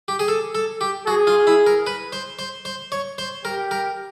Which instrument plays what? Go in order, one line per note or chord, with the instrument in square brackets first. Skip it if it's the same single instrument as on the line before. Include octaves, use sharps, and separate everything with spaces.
[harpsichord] G4
G#4
A4
A4
G4
[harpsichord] F#4 [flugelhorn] G#4
[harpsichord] F4
E4
A#4
B4
C5
C5
C5
C#5
C5
[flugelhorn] G4 [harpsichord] A#4
[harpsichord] A#4